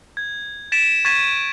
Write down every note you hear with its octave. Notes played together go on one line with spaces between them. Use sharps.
G#6
A6 B6 D7 E7
C#6 G#6 A6 B6 D#7 E7